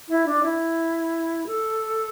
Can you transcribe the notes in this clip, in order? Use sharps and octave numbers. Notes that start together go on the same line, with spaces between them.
E4
D4
E4
A4